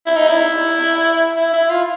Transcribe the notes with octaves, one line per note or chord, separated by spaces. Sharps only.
E4
D#4
E4
E4
E4
F4